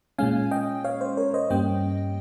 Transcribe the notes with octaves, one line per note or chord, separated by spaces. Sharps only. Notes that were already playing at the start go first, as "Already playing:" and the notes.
A#2 G#3 C#4 F5 G#5
D#5 G5
C#5 F5
C5
A#4 C#5
C5 D#5
G2 G3 A#3 C#4 D#5 G5